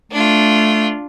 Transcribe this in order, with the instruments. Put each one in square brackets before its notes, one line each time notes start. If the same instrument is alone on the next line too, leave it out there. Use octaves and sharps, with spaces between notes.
[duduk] A3 [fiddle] D4 F4